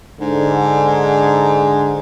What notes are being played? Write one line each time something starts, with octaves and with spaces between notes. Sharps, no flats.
G#2 D3